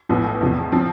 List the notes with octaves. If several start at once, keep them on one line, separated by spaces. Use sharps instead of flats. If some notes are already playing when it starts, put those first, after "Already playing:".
A1 A2 F3 B3
E2 C3 F3
F3 C4